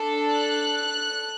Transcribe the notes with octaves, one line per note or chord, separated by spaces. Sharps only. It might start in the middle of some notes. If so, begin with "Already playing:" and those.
Already playing: D4 A4
F#6